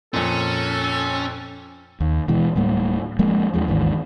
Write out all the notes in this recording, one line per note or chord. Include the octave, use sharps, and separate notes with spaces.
F2 A#2 C#4 A4
D#2
B2 E3 G#3
D1 A2 G3 A#3
F3 G#3 A#3
E2 F3 G#3
G#1 D#2 G#2 E3